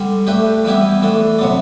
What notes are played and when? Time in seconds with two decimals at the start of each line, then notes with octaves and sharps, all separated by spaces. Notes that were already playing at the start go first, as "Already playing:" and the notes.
Already playing: D3 G3
0.27 A3 D4 G4 B4
0.65 E3 G3 B3 E4 G4
1.02 E3 A3 D4
1.39 C3 F#3 B3 D4